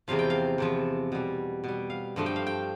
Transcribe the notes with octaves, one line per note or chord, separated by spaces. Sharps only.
E2 C3 F3 F5
G5
F5
E2 C3 F3
B2 G3
B2 G3
F5
G2 F3 A3
G5
F5
G5